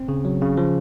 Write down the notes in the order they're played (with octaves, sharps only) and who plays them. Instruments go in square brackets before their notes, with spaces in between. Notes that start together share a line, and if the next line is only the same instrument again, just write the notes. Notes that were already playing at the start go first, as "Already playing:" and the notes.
Already playing: [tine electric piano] C4
C#3
F#3
C#3
F3